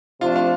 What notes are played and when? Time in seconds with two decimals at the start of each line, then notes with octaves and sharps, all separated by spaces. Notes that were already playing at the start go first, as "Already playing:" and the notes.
0.21 C3 F3 A3 D4 F4
0.36 F4